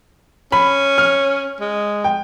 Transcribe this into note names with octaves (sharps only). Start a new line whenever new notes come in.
C#4 B5
F6
G#3
G5